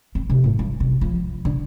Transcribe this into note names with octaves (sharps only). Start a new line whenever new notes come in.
C4
C3
A2
G2
C3
F3
D3